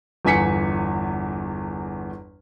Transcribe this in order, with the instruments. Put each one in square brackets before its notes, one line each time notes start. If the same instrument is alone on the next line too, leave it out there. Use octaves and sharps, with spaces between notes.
[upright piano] G1 E2 G#5 B6 C#7